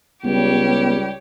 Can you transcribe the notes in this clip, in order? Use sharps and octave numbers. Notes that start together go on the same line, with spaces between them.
C#2 G3 B3 G4 C#5